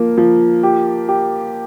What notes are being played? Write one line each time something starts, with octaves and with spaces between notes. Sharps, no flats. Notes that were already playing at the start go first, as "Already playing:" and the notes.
Already playing: F3 A#3
F3
G4
G4